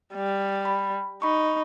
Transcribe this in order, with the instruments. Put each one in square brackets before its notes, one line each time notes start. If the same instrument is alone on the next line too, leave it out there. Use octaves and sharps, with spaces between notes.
[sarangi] G3
[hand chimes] B5
[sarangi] D#4 [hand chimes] B5 C#6